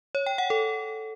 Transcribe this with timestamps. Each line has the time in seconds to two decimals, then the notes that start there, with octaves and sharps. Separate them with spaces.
0.15 C#5
0.26 G5
0.38 F#5
0.50 A4